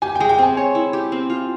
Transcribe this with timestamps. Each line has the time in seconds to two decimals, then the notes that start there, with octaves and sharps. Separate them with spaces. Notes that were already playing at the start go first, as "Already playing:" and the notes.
0.02 G4 G#5
0.15 G5
0.20 G#3
0.29 G5
0.38 C4 G#5
0.57 C#5
0.75 E4
0.93 G4
1.12 C4
1.30 F4